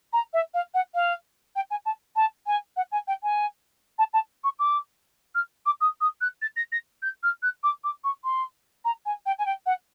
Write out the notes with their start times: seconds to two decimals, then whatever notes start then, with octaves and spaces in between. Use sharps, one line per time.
0.13 A#5
0.33 E5
0.54 F5
0.74 F#5
0.94 F5
1.55 G5
1.70 G#5
1.85 A5
2.16 A5
2.46 G#5
2.76 F#5
2.91 G#5
3.07 G5
3.23 G#5
3.98 A5
4.13 A5
4.44 C#6
4.59 D6
5.35 F6
5.66 D6
5.81 D#6
6.01 D#6
6.21 F#6
6.42 A6
6.56 A#6
6.72 A#6
7.02 G6
7.23 F6
7.42 F#6
7.63 D6
7.84 D6
8.04 C#6
8.24 C6
8.85 A#5
9.05 G#5
9.26 G5
9.38 G#5
9.46 G5
9.66 F#5